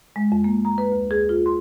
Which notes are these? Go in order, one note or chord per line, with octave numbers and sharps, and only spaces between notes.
G#3
F2
A#3
A#5
B4
D2
G#4
F4
C6